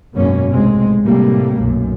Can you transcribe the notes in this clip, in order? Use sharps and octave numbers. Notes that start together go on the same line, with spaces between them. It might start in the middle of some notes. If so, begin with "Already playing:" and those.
G#1 F#2 B2 A#3 C#4
B1 A2 C3 G#3 C4
A2 C3 G3 A3 A#3
B1 F#2 A#2